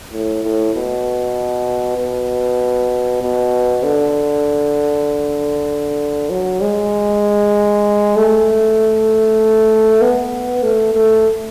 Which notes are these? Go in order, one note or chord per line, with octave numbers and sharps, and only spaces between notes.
A2
A2
B2
B2
B2
D3
F#3
G#3
A3
B3
A3
A3